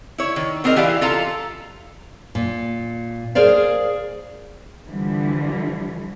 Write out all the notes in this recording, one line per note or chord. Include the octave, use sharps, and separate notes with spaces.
E4 C#5
D#3
B3 C4 G#4 A#4 D#5
E3 E4 G4 D5 F5
F4 A4 F5 A#5
A#2
G#4 A#4 C5 D5 F5
D3 E3 F3 G3